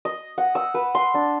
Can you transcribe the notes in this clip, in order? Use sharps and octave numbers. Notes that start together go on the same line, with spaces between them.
D#5
F#5
E6
B4
C6
D4